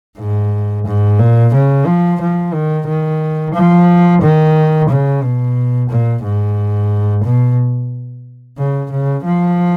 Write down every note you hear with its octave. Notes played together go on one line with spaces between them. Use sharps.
G#2
G#2
A#2
C#3
F3
F3
D#3
D#3
F3
D#3
C#3
B2
A#2
G#2
B2
C#3
C#3
F3